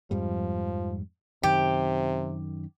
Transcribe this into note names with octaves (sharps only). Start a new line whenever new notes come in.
F2 G#2 F3 G3
F#2 C3 D#3 G4